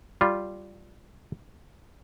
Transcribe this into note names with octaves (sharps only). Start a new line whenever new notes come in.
G3 F4